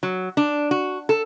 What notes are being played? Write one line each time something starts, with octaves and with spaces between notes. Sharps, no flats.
F#3
D4
F#4
A4